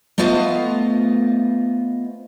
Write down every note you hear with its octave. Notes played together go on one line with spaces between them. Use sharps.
A3 B3 F4 C5 D#5 F5